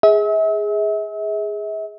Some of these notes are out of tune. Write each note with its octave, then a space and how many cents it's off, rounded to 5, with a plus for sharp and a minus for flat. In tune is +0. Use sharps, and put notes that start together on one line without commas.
G#4 -5 E5 -40